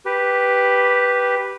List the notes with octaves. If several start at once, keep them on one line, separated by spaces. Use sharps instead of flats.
G4 B4